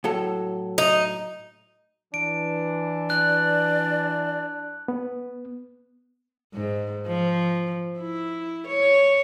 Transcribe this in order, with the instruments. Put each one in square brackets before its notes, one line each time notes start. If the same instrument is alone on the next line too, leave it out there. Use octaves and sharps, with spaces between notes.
[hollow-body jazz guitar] A2 F#3 A4
[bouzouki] D#4
[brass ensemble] E3 [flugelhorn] D4 [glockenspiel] D7
[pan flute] D5 [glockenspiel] F#6
[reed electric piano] B3
[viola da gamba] G#2
F3
E4
C#5